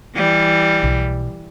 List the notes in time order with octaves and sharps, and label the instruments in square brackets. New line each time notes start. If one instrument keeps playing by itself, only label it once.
[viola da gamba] E3 G3
[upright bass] B1